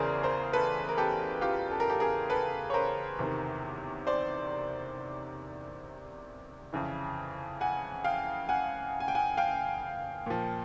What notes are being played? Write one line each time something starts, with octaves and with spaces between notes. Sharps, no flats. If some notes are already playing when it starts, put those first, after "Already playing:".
Already playing: E2 C#3 E3 G#4 A#4 C5 D5
A#4 C5
A4 B4
A#4
G4 A4
F4 G4
A4
A#4
G4 A4
G#4 A#4
A4 B4
C#5
A#4 C5
E2 C3 D#3
C5 D5
F2 C#3 E3
F#5 G#5
F5 G5
F#5 G#5
G#5
G5
F#5 G#5
F5 G5
A#2 F3